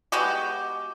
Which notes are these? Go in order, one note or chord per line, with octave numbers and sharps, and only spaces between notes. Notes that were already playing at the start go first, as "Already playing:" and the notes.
G#3 B3 F#4 G4